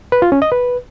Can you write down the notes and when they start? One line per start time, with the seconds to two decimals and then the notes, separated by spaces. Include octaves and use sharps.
0.12 B4
0.22 F4
0.32 C#4
0.42 D#5
0.52 B4